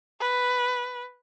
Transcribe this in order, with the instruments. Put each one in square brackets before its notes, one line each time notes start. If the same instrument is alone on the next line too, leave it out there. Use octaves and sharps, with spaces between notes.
[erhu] B4